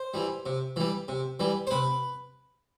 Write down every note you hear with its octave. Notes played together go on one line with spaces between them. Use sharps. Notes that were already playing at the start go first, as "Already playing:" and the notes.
Already playing: C5
E3 G3
C3
E3 G3
C3
E3 G3
C5
C3 B4